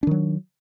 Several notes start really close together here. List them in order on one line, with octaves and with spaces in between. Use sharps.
D4 D#3 F#3